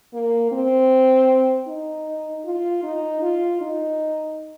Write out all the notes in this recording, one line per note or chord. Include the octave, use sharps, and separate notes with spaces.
A#3
C4
D#4
F4
D#4
F4
D#4